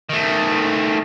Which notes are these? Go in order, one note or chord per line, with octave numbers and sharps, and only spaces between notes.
D#3 A3